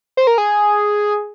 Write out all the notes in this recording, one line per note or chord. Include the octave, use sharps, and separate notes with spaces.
C5
A#4
G#4